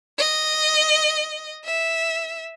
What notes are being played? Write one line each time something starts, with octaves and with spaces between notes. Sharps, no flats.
D#5
E5